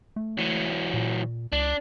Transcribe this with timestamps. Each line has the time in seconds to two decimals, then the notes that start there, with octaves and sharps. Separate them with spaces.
0.16 A3
0.38 E3 F#3
0.94 A#2
1.52 C#2 D4